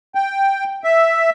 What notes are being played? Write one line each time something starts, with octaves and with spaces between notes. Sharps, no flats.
G5
E5